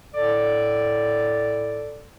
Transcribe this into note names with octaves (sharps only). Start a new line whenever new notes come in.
A2 A4 D5